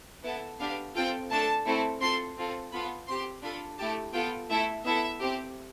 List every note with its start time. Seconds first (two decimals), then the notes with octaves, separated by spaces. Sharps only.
0.24 B3 E4 A4 A5
0.60 B3 D4 G4 F5
0.95 C4 F4 A4 G5
1.30 A3 D4 A4 A5
1.66 A3 C4 E4 A4
2.01 C4 F4 A4 C6
2.37 C4 F4 A4
2.72 B3 F4 A4 B5
3.08 C4 G4 C6
3.43 D4 F4 A4 B5
3.78 A3 E4 G4 A5
4.13 B3 F4 A4 G5
4.49 A3 E4 A4 E5
4.84 B3 E4 A4 E5
5.20 C4 G4